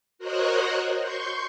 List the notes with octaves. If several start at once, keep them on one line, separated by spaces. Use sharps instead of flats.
F#4 A#4 C5 C#5 D#5 F#5
C6 C#6 G6